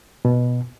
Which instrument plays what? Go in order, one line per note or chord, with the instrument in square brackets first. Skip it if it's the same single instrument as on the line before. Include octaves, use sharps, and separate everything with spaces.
[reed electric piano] B2